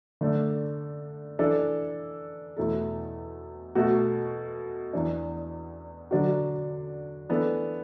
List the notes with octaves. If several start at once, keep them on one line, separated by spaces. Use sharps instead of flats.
D3 A3 D4
E3 D4 A4
E2 B2 A3 E4 A4
B2 A3 F#4
E2 E3 D4
D3 F#3 D4 F#4
E3 B3 D4 A4